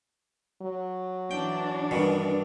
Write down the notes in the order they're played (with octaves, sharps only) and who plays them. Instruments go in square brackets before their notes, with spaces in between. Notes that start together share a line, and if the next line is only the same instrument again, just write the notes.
[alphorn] F#3
[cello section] E3 D4 [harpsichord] G5
[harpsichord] G2 B2 D#3